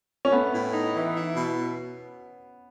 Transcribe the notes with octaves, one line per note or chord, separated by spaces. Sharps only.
C#4
A3 B3
A2
D#4
E3
E4
B2